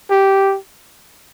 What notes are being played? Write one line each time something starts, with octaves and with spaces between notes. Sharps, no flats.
G4